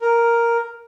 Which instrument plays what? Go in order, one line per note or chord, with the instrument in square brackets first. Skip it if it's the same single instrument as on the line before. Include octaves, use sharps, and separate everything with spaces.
[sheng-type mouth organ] A#4